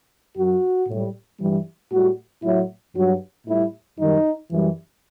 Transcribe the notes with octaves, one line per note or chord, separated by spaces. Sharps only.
F#2 F#3 F#4
A2 G3
G2 E3 G3
A2 G3 F#4
A2 F#3 E4
G2 F#3 F#4
A2 G3 E4
F#2 D#3 G3 D#4
F#2 E3 G3